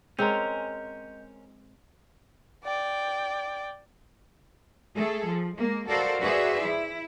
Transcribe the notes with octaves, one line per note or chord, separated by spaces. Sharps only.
G#3 C4 C#4 A#4 D#5 G6
D5 G5
A3 G#4 A4
F3
G#3 A#3
F#4 A4 A#4 C5 D5 F5
F#4 G#4 B4 C5 D5 E5
E4